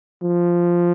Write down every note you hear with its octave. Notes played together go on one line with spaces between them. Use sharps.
F3